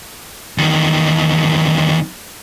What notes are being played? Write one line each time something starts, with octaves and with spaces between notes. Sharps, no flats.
E2 D#3